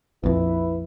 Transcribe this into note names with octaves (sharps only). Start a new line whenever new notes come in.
A#1 F2 E4 B4